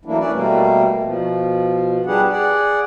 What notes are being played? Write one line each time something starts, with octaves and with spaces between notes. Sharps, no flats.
E3 F#3 A3 A#3 D4 E4
C#4 E4 B4 D5
B2 G3 A3 A#3
B2 F3
G3 D4 G4 G#4 B4 F#5
G#4 D5 F#5